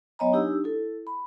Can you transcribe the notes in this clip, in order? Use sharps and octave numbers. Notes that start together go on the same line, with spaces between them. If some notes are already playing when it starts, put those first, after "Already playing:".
F#3 B3 C#5 D#5 G#5 A#5
D4 D#4 G4 E6
E4 A4
B5